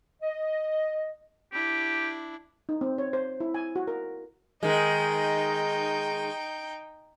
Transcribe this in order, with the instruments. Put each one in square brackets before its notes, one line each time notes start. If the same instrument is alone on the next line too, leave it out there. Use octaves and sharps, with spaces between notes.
[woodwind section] D#5
[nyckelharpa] D4 E4 [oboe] G4
[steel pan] D#4
C4
C#5
C5
E4
G#5
F#4
A#4
[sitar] D#3 G#3 [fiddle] D#4 G5